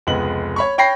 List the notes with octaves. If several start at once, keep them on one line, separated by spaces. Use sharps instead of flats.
F1 C#2 G#3 B3 F#7
C#5 B5 C#6
C#5 G5 B5 A#6 C7